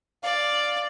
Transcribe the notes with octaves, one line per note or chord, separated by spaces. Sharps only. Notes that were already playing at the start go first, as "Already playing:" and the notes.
D5 F5